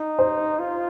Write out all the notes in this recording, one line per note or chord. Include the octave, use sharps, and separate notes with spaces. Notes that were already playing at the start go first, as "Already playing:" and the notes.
Already playing: D#4
C5
F4